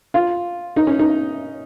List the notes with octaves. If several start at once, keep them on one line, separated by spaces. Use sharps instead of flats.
F4
D#4
C#4
D#4